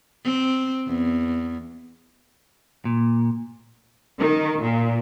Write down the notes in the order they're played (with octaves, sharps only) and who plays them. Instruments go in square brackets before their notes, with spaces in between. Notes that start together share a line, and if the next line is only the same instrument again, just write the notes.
[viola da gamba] C4
E2
[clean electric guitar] A#2
[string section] D#3
A#2